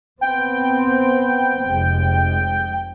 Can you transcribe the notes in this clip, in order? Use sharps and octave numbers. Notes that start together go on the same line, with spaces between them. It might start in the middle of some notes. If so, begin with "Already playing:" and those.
B3 C4 G5
F1 G#3